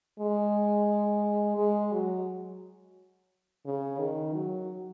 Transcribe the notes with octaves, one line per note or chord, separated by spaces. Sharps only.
G#3
G#3
F#3
C#3
D#3
F#3